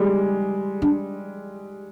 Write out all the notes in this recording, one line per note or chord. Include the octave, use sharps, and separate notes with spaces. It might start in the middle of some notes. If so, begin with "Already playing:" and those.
Already playing: G3 G#3
D4